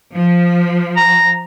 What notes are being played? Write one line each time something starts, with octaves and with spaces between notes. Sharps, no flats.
F3
A#5